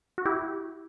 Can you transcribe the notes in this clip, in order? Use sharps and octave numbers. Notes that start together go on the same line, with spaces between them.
F#4
E4 G4